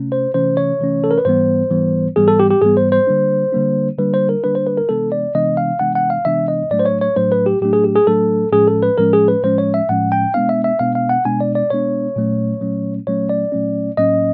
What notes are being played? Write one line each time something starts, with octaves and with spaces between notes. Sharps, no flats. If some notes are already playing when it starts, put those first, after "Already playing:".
Already playing: C3 A3 C#4
C5
C3 E3 A3 C#4 C5
C#5
C3 E3 A3 C#4
A4
A#4
B4
G#2 E3 G3 B3 C5
G#2 E3 G3 B3
G#2 E3 G3 B3 G#4
A4
G4
G4
G#2 E3 G3 B3 G#4
C5
C5
D3 G3 A#3 D4
D3 G3 A#3 D4
D3 G3 A#3 D4 B4
C5
A#4
D3 G3 A#3 D4 B4
C5
B4
A#4
C3 E3 G#3 B3 D4 A4
D5
C3 E3 G#3 B3 D4 D#5
F5
C3 E3 G#3 B3 D4 F#5
F#5
F5
C3 E3 G#3 B3 D4 E5
D#5
A2 F#3 A3 D4 D5
C5
C#5
C#5
A2 F#3 A3 D4 C5
B4
G4
A2 F#3 A3 D4 G4
G#4
G4
G#4
A2 F#3 A3 D4 A4
A2 F3 G#3 C#4 G#4
A4
B4
A2 F3 G#3 C#4 A#4
G#4
B4
A2 F3 G#3 C#4 C5
C#5
E5
A2 F3 G#3 C#4 F#5
G5
B2 G#3 B3 D4 F5
E5
E5
B2 G#3 B3 D4 F5
F5
F#5
B2 G#3 B3 D4 G#5
D5
D5
B2 G#3 B3 D4 C#5
A#2 F#3 A3 C#4
A#2 F#3 A3 C#4
A#2 F#3 A3 C#4 C#5
D5
A#2 F#3 A3 C#4
A2 F#3 A#3 C#4 D#5